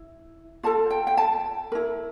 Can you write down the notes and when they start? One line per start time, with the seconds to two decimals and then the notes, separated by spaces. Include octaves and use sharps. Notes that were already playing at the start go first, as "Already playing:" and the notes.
Already playing: E4
0.63 F4 A4 A5
0.90 G5
1.07 G5
1.17 A5
1.72 E4 A#4